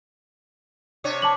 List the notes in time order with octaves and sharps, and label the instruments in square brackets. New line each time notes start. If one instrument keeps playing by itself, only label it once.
[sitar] C3 D4 C#5
[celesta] A5 D6 F#7